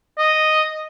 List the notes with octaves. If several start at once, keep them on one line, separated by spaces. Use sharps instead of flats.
D#5